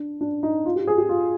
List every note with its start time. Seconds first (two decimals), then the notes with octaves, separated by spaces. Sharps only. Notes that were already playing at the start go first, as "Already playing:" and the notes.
Already playing: D4
0.21 D4
0.43 D#4
0.66 F4
0.76 G4
0.87 G#4
0.98 G4
1.09 F4